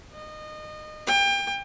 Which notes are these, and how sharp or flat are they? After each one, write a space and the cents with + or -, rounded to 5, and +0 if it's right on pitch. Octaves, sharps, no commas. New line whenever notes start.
D#5 -25
G5 +30